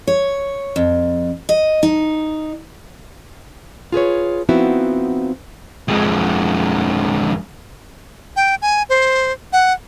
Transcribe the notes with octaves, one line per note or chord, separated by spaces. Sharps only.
C#5
F2
D#5
D#4
F4 G#4 B4 C#5
F3 B3 C4 D#4 E4 F#4
F2 G#3
G5
G#5
C5
F#5